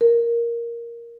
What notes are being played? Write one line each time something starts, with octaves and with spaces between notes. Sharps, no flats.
A#4